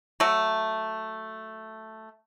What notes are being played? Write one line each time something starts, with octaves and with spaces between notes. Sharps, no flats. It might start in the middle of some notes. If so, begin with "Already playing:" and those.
F#3 A3